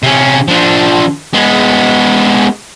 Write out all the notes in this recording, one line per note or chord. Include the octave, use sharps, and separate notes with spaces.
C3 C#4
F3 D4
G#3 B3